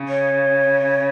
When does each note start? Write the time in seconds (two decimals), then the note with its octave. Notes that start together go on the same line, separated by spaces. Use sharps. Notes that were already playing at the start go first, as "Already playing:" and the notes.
Already playing: C#3
0.09 C#5